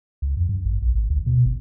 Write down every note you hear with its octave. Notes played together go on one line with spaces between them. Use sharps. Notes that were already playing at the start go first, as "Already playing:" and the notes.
C#2
F2
G2
G#1
B1
G#1
D2
B2
G1